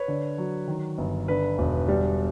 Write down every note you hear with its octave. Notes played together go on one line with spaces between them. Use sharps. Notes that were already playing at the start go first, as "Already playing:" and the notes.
Already playing: B4 C#5
D3
F#3
D#3
G1
D3 B4
E1
G3